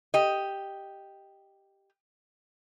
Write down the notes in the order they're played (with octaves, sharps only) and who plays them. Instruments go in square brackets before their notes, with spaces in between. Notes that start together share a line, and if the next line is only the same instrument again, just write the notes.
[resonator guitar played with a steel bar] G4 D#5